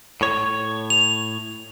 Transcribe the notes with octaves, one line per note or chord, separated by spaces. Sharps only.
A2 C#5
F7